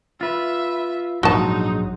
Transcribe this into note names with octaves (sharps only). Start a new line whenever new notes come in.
F4 B4 E5
A#1 G#2 F#3 G#3 D4 D#4 F#4 A5